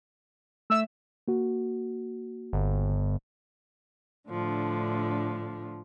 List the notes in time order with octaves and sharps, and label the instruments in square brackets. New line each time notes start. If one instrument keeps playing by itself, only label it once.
[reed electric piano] A3 E5 [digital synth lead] E6
[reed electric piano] A#3 F#4
[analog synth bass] G1
[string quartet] A2 D3 F3 D4